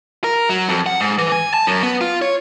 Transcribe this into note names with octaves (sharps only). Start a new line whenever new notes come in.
A#4
F#3
F2
F#5
G#2
E3
G#5
A5
F#2
B3
F4
C#5